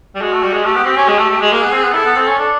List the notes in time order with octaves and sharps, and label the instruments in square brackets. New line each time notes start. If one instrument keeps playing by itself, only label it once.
[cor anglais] G3
[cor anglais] G#3 [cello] F#4
[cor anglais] A3
G3
G#3
[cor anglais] A3 [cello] G4
[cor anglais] B3
C4
C#4
G#3
A3
A3
G#3
[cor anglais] A#3 [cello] G#4
[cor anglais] B3
C4
B3
[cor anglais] E4 [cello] A4
[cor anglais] B3
C4
C#4
D4